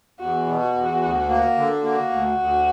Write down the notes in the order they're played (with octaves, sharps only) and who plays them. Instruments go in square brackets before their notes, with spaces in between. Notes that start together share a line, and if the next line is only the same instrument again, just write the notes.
[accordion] E2 [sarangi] F#4
[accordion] B2
[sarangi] F#4
[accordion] E2
D2
A#3
D3
[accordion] A#3 [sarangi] F#4
[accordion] D2
D2